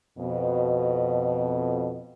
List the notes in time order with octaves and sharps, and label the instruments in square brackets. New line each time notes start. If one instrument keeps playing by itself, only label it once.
[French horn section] F2 B2